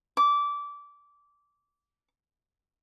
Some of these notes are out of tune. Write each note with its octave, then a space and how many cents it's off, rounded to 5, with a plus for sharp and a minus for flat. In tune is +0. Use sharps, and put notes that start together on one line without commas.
D6 -20